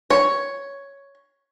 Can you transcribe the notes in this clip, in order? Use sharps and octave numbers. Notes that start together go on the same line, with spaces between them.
C#5